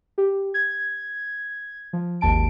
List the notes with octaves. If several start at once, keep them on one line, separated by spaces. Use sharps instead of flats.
G4
G#6
F3
G#1 D#2 A5 D7